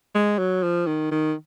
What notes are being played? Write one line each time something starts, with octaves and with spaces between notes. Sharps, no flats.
G#3
F#3
F3
D#3
D#3